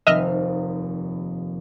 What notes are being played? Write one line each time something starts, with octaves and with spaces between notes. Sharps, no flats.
F1 D#2 D#5 E5 F6